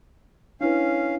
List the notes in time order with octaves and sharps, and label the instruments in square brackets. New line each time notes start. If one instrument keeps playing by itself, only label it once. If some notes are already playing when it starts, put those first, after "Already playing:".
[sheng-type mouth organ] C#4 F5 [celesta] D4 E4 B4